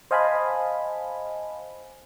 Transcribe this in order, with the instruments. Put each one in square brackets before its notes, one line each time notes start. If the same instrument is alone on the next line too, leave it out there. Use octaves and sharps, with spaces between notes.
[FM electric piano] C5 D#5 F5 G#5 A5 B5